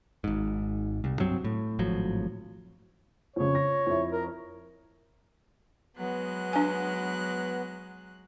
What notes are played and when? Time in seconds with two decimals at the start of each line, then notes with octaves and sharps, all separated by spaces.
0.24 G#1 G#2
1.04 C2
1.19 G2 F#3 C4
1.44 A2
1.79 G#1 A2 F3 F#3
3.36 F2 C#3 C#5
3.55 A#6
3.87 F2 E4
4.12 A#4
5.97 F#3 G#3 B3 F#6
6.53 D4 G#5